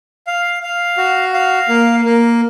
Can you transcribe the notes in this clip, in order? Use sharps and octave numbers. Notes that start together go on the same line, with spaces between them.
F5
F5
F#4
F5
A#3
A#3